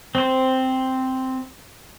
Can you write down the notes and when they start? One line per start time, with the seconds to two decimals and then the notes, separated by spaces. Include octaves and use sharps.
0.15 C4 C5